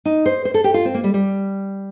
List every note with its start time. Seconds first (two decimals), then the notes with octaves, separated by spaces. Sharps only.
0.05 D#4
0.26 C5
0.45 C5
0.54 A4
0.64 G4
0.74 F4
0.85 C4
0.94 A#3
1.04 G3
1.14 G3